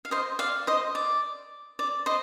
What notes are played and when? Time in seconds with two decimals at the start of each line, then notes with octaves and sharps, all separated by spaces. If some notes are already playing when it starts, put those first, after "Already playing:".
0.05 F5
0.11 C5 D#5
0.39 D5 F5
0.67 C5 D#5
0.95 D5
1.79 D5
2.06 C5 D#5